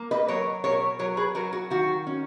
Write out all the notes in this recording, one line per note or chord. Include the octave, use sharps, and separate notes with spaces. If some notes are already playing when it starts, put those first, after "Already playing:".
Already playing: A#3
B4 D#5
F#3 A#4 C#5
B2 A#4 C#5
F#3 A#4 C#5
G#4 B4
F#3 F#4 A#4
F#4
D#3 F#4
C#4